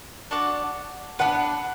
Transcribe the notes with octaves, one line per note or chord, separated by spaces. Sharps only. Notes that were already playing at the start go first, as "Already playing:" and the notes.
D4 F#4 D5 F#5
B3 D4 B4 F#5